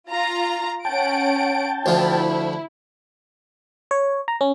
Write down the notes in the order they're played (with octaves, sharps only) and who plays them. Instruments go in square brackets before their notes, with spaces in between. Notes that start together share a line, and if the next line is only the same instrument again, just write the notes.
[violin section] F4 A#5
[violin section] C#4 F#5 D7 [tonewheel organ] G5 A5
[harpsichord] D2 F3 [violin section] E4
[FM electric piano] C#5
A#5
C#4